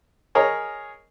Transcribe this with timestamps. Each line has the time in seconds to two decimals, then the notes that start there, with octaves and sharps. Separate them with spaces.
0.35 G#4 A#4 C#5 D#5